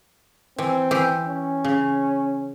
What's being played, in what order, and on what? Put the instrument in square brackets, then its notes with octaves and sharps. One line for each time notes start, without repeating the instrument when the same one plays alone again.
[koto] E3 [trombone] C4
[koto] E3 G4
[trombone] C#4
[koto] C#3